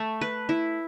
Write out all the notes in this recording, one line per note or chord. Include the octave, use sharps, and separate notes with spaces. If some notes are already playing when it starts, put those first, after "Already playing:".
Already playing: A3
B4
E4